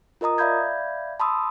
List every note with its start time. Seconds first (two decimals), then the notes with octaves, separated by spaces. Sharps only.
0.21 F4 A#4 D#5 A#5 D#6
0.38 D5 E5 F5 B5 G6 G#6
1.20 A5 B5 C6 D#6 E6